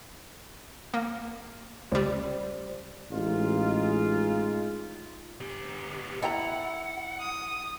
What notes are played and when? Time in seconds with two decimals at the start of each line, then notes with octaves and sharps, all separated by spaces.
0.94 A#3
1.91 C#2 G3 C5 D5
3.11 A1 G#3 D#4 F4
5.40 B3 G4
6.22 E4 A4 F#5 G5 A#5
7.20 D#6